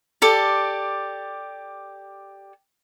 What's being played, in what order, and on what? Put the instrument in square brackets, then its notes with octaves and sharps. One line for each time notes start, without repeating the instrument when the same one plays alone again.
[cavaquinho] G4 A4 D5